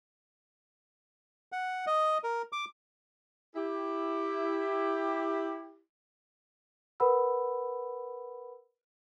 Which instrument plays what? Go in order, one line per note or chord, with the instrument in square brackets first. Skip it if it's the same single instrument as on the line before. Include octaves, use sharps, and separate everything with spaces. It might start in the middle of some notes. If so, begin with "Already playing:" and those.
[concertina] F#5
D#5
A#4
D6
[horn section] E4 G4
[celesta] A#4 B4 F#5 B5 E6